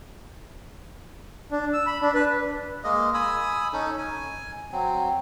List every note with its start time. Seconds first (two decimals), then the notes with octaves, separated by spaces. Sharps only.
1.52 D4
1.73 E6
1.87 B5
2.02 D4
2.15 B4
2.84 G#3 A#3 D#5
3.14 G#5 B5 D#6 E6
3.73 C#4 D#4 A4
3.98 G#5
4.72 F#3 C4